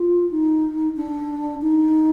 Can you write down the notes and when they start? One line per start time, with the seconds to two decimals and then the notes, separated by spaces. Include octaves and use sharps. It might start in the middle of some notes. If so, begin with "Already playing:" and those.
Already playing: F4
0.31 D#4
0.97 D4
1.62 D#4